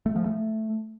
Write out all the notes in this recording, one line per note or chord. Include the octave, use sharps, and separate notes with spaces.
A3
F3
A3